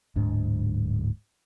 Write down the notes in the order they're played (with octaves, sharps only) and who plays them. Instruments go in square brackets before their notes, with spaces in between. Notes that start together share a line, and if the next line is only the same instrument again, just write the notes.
[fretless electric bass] D1 G#2 D4